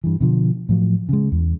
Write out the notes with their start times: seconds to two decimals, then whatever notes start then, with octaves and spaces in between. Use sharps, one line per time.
0.04 G2 E3
0.20 B2 D3 F3
0.69 A2 F3 F#3
1.09 C#3 G#3
1.32 E2